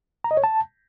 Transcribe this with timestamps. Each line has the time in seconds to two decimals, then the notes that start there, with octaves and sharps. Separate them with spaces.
0.24 A#5
0.31 D#5
0.37 C#5
0.44 A5